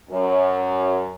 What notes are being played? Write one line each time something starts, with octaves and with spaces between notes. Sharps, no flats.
F#2